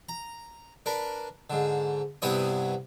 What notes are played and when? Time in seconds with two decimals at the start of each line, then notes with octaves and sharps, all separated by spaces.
0.09 A#5
0.86 D4 A#4 B4
1.50 G#2 D3
2.22 G2 C3 B3 E4 C#5 D#6